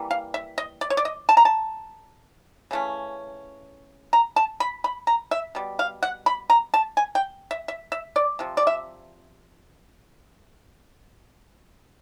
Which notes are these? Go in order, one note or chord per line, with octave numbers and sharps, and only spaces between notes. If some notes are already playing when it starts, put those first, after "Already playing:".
Already playing: E3 G3 A#3
F5
E5
D#5
D5
C#5
D5
D#5
A5
A#5
A5
C#3 E3 A3 C#4
A#5
A5
B5
B5
A#5
E5
B2 G3
F5
F#5
B5
A#5
A5
G#5
G5
E5
E5
E5
D5
C3 F3
D5
E5